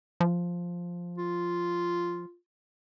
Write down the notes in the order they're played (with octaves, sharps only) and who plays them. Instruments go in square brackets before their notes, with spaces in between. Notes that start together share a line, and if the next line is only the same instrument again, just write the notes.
[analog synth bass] F3
[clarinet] F4